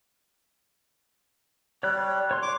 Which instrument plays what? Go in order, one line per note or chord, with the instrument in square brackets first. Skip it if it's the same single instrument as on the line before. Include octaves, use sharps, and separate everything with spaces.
[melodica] G3 [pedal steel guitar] C#5 F#6
[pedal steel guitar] C#5 C6
[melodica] D6